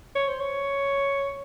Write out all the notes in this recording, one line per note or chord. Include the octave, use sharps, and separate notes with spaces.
C#5
C5
C#5